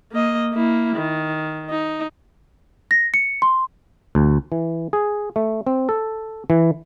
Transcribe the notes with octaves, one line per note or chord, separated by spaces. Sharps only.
A#3 D#5
A#3 E4
D#3
D#4
A#6
C#7
C6
D2
E3
G#4
A3
C4
A4
E3